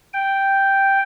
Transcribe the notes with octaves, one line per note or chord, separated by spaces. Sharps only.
G5